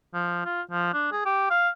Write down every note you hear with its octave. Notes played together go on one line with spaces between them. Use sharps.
F3
F4
F3
D4
G#4
G4
F5